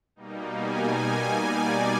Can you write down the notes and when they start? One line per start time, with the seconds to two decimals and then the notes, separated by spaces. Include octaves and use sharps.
0.16 B2 G3 A#3 D#4
0.56 G#5
1.36 D5